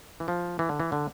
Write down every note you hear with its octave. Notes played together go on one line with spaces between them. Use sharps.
E3
F3
E3
D3
E3
D3